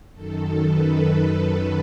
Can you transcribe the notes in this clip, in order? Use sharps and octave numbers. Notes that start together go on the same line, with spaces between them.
F#2 D#3 A4
B4
A4